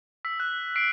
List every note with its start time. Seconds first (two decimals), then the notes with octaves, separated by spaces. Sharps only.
0.25 E6 B6
0.40 F#6
0.76 E6 B6 C7 D7